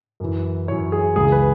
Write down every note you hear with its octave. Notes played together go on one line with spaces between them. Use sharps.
F#2 E3
F#2 E3 C#5
G#4
C#2 C#3 E3 G#4
B4